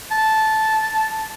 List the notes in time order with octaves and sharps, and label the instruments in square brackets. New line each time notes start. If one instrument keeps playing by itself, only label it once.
[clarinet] A5